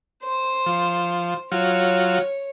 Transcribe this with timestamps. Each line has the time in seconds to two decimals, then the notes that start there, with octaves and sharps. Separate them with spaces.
0.24 C5
0.66 F3
1.52 F#3 F4 C#5